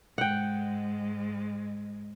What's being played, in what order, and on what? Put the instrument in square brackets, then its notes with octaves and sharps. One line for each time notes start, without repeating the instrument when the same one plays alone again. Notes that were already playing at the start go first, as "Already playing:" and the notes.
[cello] G#2 G#3 [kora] F#5 G5